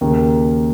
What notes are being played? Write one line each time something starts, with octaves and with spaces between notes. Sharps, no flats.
D#2 C#3 A#3